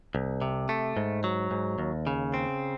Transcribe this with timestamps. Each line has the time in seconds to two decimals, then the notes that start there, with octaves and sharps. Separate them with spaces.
0.15 C2
0.42 C3
0.69 A3
0.97 G#2
1.24 F#3
1.51 G#2
1.78 D#2
2.07 C#3
2.34 C4